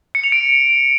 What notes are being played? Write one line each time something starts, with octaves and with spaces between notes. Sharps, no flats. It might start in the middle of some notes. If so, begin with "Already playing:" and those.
C#7
F7
D7